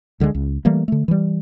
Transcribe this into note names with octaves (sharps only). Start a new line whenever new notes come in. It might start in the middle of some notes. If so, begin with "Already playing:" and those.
C#2 D3 F3 G#3
C#2
E3 G3 A3 A#3
D3 A3
E3 G3